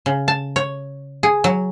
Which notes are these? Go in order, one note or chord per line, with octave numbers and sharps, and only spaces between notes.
C#3
A5
C#5
G#4
F#3